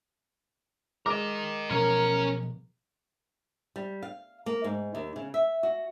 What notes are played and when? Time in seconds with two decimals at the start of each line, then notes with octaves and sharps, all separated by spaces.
1.06 G#3 A#4 D#5 D6
1.70 B2 F3 F#3 C#4 A#4 C#5
3.76 G3
4.03 F5
4.46 A#3
4.64 G#2
4.95 D#2
5.16 C#3
5.34 E5
5.63 F#4